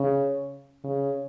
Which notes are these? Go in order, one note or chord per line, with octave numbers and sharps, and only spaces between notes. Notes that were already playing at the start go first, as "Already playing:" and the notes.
Already playing: C#3
C#3